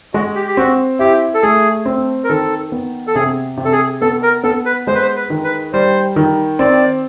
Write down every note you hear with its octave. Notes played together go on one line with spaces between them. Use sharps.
G#3 F#4
G4
G4
C4 F#4
E4 G4
A4
A3 G#4
C4
A#4
D#3 A4
B3
A4
C3 G#4
C3
A4
G#4
B3 A4
A#4
B3 A4
B4
G#3 C5
B4
C5
B4
D#3
B4
G3 C5
D#3
C4 D5